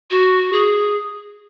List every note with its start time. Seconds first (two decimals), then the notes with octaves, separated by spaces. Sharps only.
0.10 F#4
0.52 G#4